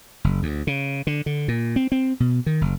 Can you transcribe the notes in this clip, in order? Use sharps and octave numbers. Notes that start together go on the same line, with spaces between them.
F#1
D2
C#3
D3
D3
A#2
C4
C4
B2
D#3
F#1